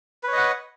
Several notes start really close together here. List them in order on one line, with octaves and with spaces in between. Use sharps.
B4 C#5 D#5 F#5